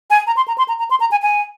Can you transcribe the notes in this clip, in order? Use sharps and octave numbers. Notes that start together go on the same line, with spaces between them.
G#5
A#5
C6
A#5
C6
A#5
A#5
C6
A#5
G#5
G#5